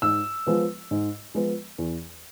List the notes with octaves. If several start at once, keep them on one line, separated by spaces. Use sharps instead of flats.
G#2 E6
F3 G#3 B3
G#2
F3 G#3 B3
E2